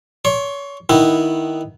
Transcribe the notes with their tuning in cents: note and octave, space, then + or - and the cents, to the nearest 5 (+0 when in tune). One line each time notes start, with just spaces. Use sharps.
C#5 +30 C6 +45
D#3 +0 B3 +0 E4 -10